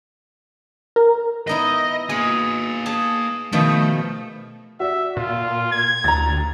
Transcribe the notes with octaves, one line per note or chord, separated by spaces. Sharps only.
A#4
B3 D#4 E4 D#5
A#3 G#4 G#5
G#4 A5
B2 D#3 F3 A3
F#4 D5 E5
A#2 F4
G#6
D2 A#5 A6